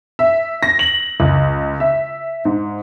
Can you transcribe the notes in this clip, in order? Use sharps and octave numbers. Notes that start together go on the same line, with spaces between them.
E5
A#6
F#7
C#2
E5
G#2